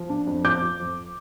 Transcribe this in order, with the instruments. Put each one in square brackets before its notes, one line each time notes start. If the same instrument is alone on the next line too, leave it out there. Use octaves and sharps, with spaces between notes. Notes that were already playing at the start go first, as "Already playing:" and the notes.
Already playing: [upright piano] F3
D4
F2
F3 D6 G6
F3
F2